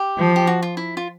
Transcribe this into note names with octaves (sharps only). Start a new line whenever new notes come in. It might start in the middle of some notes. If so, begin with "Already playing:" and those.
Already playing: G4
F3
G4
F#4
F4
E4
F4